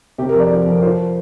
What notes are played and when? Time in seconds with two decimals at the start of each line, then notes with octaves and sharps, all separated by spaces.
0.18 C3 G4
0.29 A#4
0.34 F2
0.40 D5
0.51 F3
0.66 F2
0.82 F3 C5